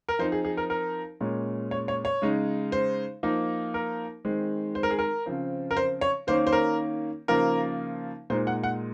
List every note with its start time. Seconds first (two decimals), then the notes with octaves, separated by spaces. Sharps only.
0.09 A#4
0.19 F3 C4 D#4 C5
0.32 G#4
0.45 G#4
0.57 A#4
0.70 A#4
1.21 A#2 G#3 C#4
1.71 C#5
1.88 C#5
2.05 C#5
2.22 C#3 G#3 D#4
2.72 C5
3.23 F3 A#3 D#4
3.74 A#4
4.25 D#3 G#3 C4
4.75 C5
4.83 A#4
4.91 G#4
4.99 A#4
5.26 C#3 F3 C4
5.71 A#4
5.77 C5
6.01 C#5
6.27 D#3 A#3 C#4 C5
6.47 C5
6.53 A#4
7.28 C#3 F3 A#3 D#4 A#4
8.30 A#2 G#3 D#4 C5
8.47 F#5
8.63 F#5